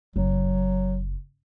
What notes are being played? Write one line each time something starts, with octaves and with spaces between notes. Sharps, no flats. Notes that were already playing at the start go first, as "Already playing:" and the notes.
F#1 F#3